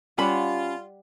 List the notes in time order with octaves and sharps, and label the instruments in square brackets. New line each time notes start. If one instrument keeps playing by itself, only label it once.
[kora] G3 F#5 [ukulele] C#4 G4 B5 [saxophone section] F4